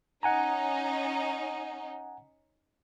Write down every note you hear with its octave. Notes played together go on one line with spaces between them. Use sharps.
C#4 D#4 F#5 G#5 A#5